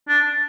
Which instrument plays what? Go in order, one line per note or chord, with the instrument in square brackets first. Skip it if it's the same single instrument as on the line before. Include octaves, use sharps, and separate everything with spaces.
[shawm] D4